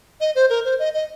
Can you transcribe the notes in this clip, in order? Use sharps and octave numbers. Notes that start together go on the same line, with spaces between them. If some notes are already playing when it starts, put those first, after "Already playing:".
D#5
C5
A#4
C5
D#5
D#5